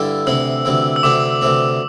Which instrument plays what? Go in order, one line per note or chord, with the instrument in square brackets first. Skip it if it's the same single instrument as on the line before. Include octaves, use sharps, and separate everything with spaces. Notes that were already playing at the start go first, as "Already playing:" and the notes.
Already playing: [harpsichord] G2 D3 G3 E4 A4
[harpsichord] D2 C3 E3 C4 [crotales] E6
[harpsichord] D2 C3 E3 C4
[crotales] E6
[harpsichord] D2 C3 E3 C4 [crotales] D6
[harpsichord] D2 C3 E3 C4